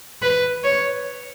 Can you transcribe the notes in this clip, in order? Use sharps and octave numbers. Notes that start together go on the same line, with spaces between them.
B4
C#5